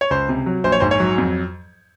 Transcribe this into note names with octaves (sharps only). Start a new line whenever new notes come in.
C#5
C#2 C5
C3
F#3
A#1 C5
C#5
G#2 C5
C#5
F#3
F2